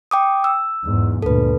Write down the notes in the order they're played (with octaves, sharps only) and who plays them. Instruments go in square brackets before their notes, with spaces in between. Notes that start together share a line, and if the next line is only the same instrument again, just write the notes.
[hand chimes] G5 D6 D#6
E6
[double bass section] E2 G#2
[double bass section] G1 D2 A#2 [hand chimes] A4 B4